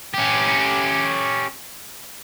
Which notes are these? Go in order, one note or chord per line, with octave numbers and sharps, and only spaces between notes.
C#4 G4